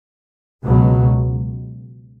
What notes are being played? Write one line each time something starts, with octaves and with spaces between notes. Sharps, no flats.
C#2 B2 F#3